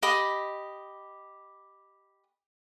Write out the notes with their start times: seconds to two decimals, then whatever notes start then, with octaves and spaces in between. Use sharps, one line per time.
0.02 G4 D#5 B5 D#6